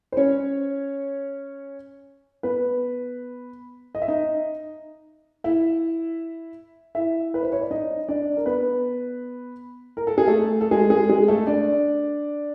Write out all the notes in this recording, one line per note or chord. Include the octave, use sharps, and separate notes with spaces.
C5
C#4 C#5
B3 B4
D#5
E5
D#4 D#5
E4 E5
E4 E5
B4
C5
C#5
D5
D#4 D#5
D4 D5
A#4
B3 B4
A#4
A4
G#4
A3 A4
A4
G#3 G#4
G#3 G#4
G#3 G#4
A3 A4
D4 D5